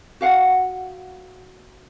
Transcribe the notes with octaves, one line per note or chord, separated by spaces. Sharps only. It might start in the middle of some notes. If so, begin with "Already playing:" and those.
F#4 F5 F#5